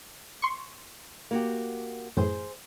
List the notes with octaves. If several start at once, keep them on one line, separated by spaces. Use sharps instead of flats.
C6 C#6
A#3 F#4 G4
F#2 A2 E3 G#4 C5